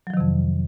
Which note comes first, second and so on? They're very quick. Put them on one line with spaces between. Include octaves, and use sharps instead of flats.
F#3 F3 D#3 C3 F2